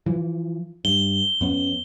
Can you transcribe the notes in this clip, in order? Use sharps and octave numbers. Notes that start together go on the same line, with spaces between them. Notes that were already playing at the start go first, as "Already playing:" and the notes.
E3 F3
G2 G7
F2 B3 C#4